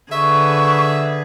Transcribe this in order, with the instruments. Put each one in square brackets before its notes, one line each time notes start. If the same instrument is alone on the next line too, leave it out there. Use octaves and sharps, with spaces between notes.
[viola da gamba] D3 G#4 B4 [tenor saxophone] E5 [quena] C#6